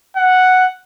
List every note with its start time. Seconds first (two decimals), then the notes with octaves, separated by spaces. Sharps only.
0.17 F#5